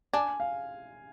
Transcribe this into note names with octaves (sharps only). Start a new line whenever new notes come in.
D4 G#5
F5